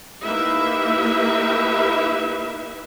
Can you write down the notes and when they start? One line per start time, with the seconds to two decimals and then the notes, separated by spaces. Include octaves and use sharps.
0.21 A#3 D#4 E4 G4 B4 E5